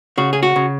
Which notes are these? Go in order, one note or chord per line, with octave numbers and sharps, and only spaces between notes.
C#3 F#4
G#4
F#4
C#3